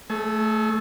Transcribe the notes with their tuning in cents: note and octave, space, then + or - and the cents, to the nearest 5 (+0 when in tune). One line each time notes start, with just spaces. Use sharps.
A3 +0 G#4 +40